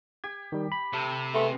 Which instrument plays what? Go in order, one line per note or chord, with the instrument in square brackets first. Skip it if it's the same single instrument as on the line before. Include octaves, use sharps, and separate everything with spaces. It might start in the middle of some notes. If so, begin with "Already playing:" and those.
[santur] G4 [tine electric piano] G#6
[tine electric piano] D#3 G3
B5
[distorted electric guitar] C3 [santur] A3
[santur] G#3 B3 C6 [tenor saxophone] A3